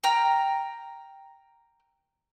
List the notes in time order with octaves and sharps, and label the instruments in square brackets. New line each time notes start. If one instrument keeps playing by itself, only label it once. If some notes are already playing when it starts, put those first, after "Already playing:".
[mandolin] G5 A#5 F6